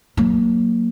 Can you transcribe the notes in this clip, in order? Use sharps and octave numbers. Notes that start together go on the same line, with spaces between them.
F#3 A#3